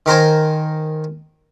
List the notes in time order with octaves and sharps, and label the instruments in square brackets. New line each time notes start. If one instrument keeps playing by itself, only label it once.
[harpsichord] D#3 A#4 C5 G#5